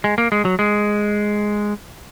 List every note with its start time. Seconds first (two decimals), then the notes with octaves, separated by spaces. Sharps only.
0.04 G#3
0.18 A#3
0.32 G#3
0.45 F#3
0.59 G#3